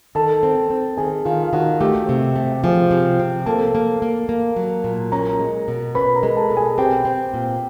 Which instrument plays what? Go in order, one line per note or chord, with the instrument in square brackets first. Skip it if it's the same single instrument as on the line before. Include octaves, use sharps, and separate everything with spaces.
[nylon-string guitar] D#3 [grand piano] A4 A5
[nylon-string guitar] C4
C4
[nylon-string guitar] D#3 [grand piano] G#4 G#5
[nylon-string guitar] D#3 [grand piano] F4 F5
[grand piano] F5
[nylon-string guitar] D#3 [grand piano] F#4 F#5
[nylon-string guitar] A3 [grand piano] G4 G5
[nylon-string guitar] C3
A3
[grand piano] G5
[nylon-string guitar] F3 [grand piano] G#4 G#5
[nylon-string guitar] C3
C4
[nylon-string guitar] A#3 [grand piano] A4 A5
[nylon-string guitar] A#3
A#3
A#3
F#3
A#2
[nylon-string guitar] C#4 [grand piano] A#4 A#5
[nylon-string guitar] G#3
B2
[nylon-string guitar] C#4 [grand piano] B4 B5
[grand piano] A#4 A#5
[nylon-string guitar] G#3
[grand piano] A4 A5
[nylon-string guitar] B2
[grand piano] G#4 G#5
[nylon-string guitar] C4 [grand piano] G4 G5
[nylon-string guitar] C4
A#2